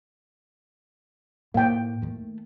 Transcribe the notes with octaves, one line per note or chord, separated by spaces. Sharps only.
A2 A#3 G5
D#3 A3